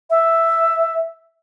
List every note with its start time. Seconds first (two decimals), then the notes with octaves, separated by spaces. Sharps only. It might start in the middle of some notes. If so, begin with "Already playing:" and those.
0.10 E5